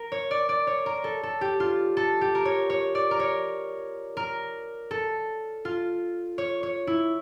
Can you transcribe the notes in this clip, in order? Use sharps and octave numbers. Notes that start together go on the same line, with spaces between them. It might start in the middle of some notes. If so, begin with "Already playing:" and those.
Already playing: A#4
C#5
D5
D5
C#5
A#4
A4
A4
G4
F4
A4
G4
A#4
C#5
C#5
D5
A#4
C#5
A#4
A4
F4
C#5
C#5
E4